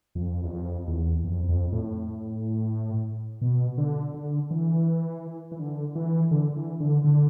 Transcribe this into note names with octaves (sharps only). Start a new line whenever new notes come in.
F2
E2
F2
E2
F2
F2
A2
B2
D3
D3
E3
E3
D3
E3
D3
E3
D3
D3